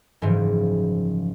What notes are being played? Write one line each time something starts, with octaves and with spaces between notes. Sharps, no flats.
F#1 G#2 E3 F3